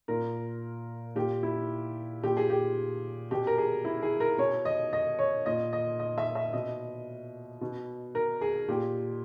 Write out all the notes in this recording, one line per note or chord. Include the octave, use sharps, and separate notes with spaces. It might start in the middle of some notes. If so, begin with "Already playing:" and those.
A#2 A#4
A#2 G4
E4
A#2 G4
G#4
G4
B2 G4
A#4
G#4
E4
G#4
A#4
B2 C#5
D#5
D#5
C#5
A#2 D#5
D#5
D#5
E5
E5
B2 D#5
B2
A#4
G#4
A#2 G4